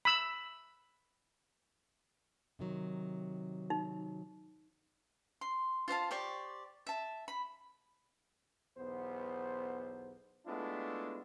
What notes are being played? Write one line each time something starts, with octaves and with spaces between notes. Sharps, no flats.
B5 E6
C3 D#3 F#3
D#4
C6
F4 C5 F5 A5
G4 C5 D5 C#6
E5 A5
B5
B1 E2 B3 C5
G#3 A3 B3 D4 E4 F4